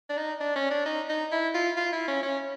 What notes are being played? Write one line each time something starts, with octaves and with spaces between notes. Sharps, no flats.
D4
D#4
D4
C#4
D4
D#4
D#4
E4
F4
F4
E4
C#4
C#4